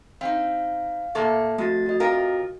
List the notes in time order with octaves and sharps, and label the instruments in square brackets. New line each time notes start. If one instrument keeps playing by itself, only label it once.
[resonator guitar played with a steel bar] C4 D#4 [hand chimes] F5
[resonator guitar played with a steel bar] A#2 A3 A#3
[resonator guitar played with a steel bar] F2 [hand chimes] A3 F#4 A6
[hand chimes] F#4 D#5
[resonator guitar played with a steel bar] C3 F4 A#4